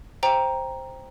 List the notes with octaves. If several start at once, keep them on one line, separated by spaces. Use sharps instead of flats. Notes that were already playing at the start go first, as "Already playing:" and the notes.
C5 G5 A#5